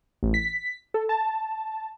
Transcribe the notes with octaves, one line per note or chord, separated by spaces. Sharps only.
A1
B6
A4
A5